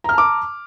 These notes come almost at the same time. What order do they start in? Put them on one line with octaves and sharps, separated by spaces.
A#5 F6 A5 D6